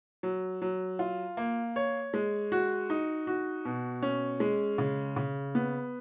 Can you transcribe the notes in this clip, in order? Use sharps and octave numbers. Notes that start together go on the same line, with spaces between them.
F#3
F#3
F4
A#3
C#5
G#3
F#4
D#4
F#4
B2
C#4
G#3
C#3
C#3
B3